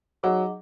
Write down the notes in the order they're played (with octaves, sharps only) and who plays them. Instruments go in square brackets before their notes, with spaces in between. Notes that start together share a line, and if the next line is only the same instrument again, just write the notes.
[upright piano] F#3 [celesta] D#4 G#4 D#5 F#5 D6